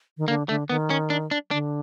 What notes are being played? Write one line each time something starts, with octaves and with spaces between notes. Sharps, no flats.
D#3
D3 A#3
D3 A3
D#3 B3
C#4
D4
D4
D3 D4